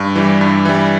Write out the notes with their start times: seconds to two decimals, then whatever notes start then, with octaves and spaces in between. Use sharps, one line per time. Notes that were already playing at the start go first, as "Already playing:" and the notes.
Already playing: G2
0.16 E3 G3
0.41 G2
0.65 E3 G3